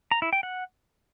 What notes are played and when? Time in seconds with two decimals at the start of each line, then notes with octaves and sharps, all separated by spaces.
0.11 A#5
0.22 E4
0.33 G5
0.43 F#5